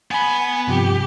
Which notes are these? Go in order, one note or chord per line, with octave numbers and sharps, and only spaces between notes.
B3 G#5 B5
G2 C3 F3 G4